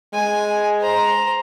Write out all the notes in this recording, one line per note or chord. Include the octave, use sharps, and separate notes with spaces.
G#3 G#5
C5 A#5